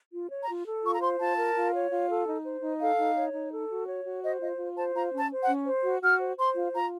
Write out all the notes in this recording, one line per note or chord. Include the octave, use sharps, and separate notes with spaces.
F4
C#5
A#5
F4
A4
F4 C#6
A#5
C5 C6
F4 A5
A#4
F4
C#5
F4
A4
D#4
C5
D#4
A4 F5
D#4
C#5
D#4
A4
F#4
C#5
F#4
C5 D#5
F4 D#5
F4
C5 A5
F4 A#5
C#4
A5
C5
F#5
C#4
C5
F#4
F#4 F6
C5
C5 C6
F4
F4 A#5